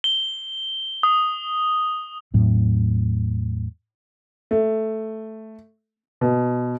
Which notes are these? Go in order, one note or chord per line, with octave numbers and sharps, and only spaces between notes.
G7
D#6
E2 A2 F#3 C4
A3
B2